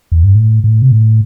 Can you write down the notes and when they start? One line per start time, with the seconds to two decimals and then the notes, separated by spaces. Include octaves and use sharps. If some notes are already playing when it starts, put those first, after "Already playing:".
0.12 E2
0.24 G2
0.35 A2
0.64 A2
0.82 C3
0.91 A2